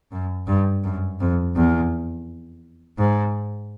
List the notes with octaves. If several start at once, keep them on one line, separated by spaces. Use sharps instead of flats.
F#2
G2
F#2
F2
E2
G#2